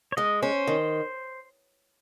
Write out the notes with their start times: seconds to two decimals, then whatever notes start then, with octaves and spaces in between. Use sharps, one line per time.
0.12 C#5
0.17 G#3 D#5
0.43 C#4 C5
0.67 D#3